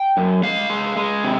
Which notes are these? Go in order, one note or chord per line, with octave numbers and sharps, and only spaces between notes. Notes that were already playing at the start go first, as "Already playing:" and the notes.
Already playing: G5
F#2
G#3 F5
G#3
G#3
C3